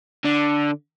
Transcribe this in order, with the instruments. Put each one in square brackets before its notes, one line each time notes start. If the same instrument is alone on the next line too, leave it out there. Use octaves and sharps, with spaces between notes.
[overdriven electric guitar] D3